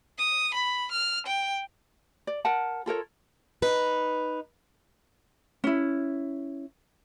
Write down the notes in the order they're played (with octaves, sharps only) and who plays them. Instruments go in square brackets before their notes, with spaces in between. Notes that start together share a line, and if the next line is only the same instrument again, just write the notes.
[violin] D#6
B5
F6
G5
[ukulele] D5
A#4 F#5 A5
F4 A4 A#4 C#5
[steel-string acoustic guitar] D#4 B4
[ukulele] C#4 E4